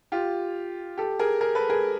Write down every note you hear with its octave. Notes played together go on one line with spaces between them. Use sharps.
F4 G4
G4 A4
G#4 A#4
G#4 A#4
A4 B4
G#4 A#4